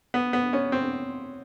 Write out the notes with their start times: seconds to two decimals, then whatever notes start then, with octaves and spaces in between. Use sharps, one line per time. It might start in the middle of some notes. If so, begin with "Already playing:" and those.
0.14 B3
0.33 B3
0.53 C#4
0.72 C4